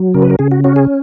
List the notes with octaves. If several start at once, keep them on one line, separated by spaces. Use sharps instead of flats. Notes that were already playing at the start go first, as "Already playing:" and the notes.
Already playing: F#3
C#3 A#4
B4
A#4
C#3 G#4
F#4
C#4 F#4
G#4